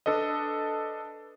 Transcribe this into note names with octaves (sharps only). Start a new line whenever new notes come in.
D4 A4 B4 D#5